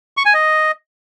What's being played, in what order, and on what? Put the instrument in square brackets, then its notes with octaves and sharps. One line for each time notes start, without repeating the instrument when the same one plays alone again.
[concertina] C#6
G#5
D#5